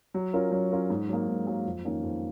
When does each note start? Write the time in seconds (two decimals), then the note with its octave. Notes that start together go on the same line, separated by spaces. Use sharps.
0.14 F#3
0.33 C#4 F4 A#4
0.52 F#3
0.71 C#4 F4 A#4
0.90 G#2
1.09 F#3 A#3
1.28 G#2
1.47 F#3 A#3
1.66 F2
1.84 D#3 A#3 C#4
2.03 F2